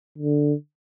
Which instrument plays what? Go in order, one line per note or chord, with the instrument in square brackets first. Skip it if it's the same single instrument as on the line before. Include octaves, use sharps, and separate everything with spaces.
[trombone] D3